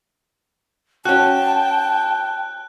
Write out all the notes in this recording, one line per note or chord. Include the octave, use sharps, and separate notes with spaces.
C#4 F#4 G5 A5 F#6